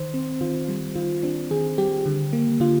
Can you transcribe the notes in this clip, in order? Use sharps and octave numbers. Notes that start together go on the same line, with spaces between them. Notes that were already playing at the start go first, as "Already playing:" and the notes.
Already playing: D#3 C5
C4
D#3 F4
G3
D#3 F4
C4 D4
D#3 G#4
G3 G4
D3
A#3
D3 F4